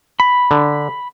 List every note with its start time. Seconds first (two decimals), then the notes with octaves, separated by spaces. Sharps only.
0.20 B5
0.51 D3